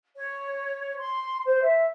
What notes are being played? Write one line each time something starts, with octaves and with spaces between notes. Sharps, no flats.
C#5
C6
C5
E5